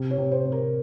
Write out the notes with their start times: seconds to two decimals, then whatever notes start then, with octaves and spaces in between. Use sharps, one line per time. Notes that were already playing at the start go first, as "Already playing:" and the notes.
Already playing: C3
0.11 C#5
0.18 C3
0.32 C5
0.45 C3
0.52 A#4